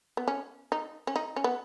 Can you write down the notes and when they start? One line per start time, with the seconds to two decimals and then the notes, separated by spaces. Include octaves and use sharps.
0.17 B3
0.28 C#4
0.72 D#4
1.07 C#4
1.16 D#4
1.36 C#4
1.44 B3